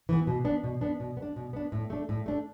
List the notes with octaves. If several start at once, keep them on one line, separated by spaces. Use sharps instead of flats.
E3 B3
B2
B3 D4
B2
B3 D4
B2
B3
D4
B2
B3 D4
A2
A3 D4
A2
A3 D4